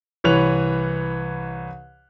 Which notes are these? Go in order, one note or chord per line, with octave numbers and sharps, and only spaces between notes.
C2 E3 B4 C#5 F#6 F7